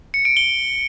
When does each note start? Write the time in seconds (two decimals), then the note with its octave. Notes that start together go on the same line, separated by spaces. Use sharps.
0.14 C#7
0.25 D7
0.37 G7